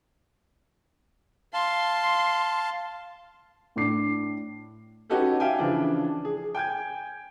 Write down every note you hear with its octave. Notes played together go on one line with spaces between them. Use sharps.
F5 A5 C6
A2 D4 D6 C7
C#4 D#4 F#4 G4 A4 B4
E5 F5 G5 G#5
C#3 E3 F3 D4
G#4
G5 G#5 G6 G#6